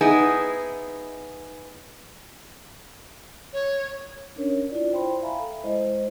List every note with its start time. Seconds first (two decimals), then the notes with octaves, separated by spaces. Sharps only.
0.01 B3 D#4 E4 G#4
3.53 C#5
4.36 C#4 D4 A#4 C#5
4.69 E4 F4 D5
4.93 C5 G5 B5 C6
5.22 E5 F5 G#5 A#5 B5
5.40 A4
5.64 G#3 E4 C5 D#5